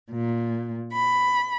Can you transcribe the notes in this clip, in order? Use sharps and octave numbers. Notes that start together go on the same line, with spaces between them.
A#2
B5